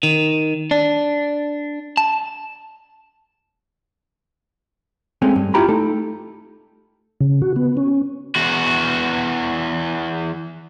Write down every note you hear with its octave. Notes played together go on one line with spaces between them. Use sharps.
D#3
D4
A5
G#3 A3 C4 C#4
G2
E4 F4 G4 A#5 B5
A3 D#4 A4
C#3
F#4
B3
C#4
E2 F#4